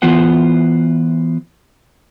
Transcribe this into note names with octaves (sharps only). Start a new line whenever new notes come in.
E3 B3 F4 C5 F#5